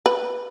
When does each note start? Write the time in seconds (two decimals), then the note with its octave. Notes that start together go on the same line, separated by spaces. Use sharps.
0.06 B4